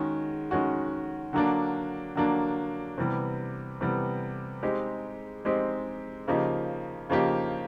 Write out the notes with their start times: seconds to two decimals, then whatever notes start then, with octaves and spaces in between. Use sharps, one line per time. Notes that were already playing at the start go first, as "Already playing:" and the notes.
Already playing: D#3 G#3 C#4 F#4
0.51 D#3 G#3 C#4 F#4
1.33 D3 F#3 A#3 D4
2.16 D3 F#3 A#3 D4
2.98 C3 E3 G3 B3
3.81 C3 E3 G3 B3
4.63 G#3 C4 D#4 G4
5.45 G#3 C4 D#4 G4
6.28 C#3 F3 A#3 D#4 G4
7.10 C#3 F3 A#3 D#4 G4